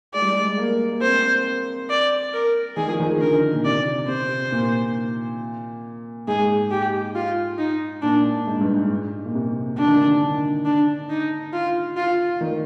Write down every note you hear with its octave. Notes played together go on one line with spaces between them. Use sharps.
G#3 D5
G3
G#3
A#3
A#3
C4 C5
D5
A#4
D#3 G#4
F3
D#3
D3 A#4
A#2
C3 D5
C3 C5
A#2
G#2 G#4
G4
F4
D#4
A#2 D4
G#2
G2
G#2
A#2
C3
D3 D4
D#3
D3
D4
D#4
F4
F4
D#3